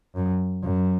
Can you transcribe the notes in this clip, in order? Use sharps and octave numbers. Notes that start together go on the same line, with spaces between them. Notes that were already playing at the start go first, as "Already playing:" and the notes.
F#2
F#2